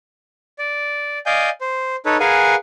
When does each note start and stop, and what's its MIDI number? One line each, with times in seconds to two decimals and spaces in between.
0.59 1.19 74
1.26 1.50 74
1.26 1.50 75
1.26 1.50 77
1.26 1.50 80
1.26 1.50 91
1.61 1.96 72
2.06 2.17 63
2.06 2.17 69
2.06 2.17 71
2.06 2.17 73
2.20 2.55 68
2.20 2.55 70
2.20 2.55 71
2.20 2.55 77
2.20 2.55 78
2.20 2.55 80